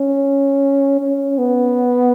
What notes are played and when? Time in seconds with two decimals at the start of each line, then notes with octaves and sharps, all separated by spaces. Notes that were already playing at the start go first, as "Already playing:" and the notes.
Already playing: C#4
1.00 C#4
1.38 B3